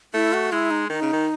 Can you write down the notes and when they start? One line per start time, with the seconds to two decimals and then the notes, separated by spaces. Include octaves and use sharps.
0.14 A3 E4
0.33 F#4
0.52 G#3 E4
0.71 D#4
0.89 D#3 D#4
1.02 C#3
1.13 D#3